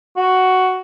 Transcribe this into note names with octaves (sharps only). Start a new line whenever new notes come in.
F#4